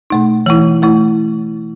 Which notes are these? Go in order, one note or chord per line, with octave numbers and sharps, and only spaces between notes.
B2 A3 D#4
E3 A3 E4
E3 A3 E4